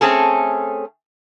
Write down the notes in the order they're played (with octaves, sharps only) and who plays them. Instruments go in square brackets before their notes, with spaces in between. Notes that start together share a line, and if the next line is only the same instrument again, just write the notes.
[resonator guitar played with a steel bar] A3 C4 C#4 G#4 A4